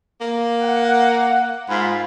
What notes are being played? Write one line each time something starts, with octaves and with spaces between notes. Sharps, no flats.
A#3
F#5
G#2 F4 G#4 B5